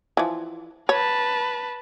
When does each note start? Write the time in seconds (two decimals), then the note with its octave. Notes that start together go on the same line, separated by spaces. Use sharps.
0.17 E3 F3
0.89 B4 C#5 A5